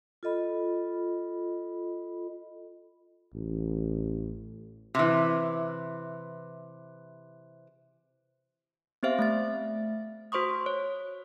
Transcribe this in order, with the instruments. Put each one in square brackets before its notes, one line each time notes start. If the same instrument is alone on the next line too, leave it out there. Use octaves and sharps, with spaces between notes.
[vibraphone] F4 A4 D#5 B5
[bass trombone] A1
[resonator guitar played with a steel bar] C3 E3
[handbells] B3 C4 G4 C5 E5 F5
A3 E5 A6
F#4 C5 C6 C#6 D#6
C#5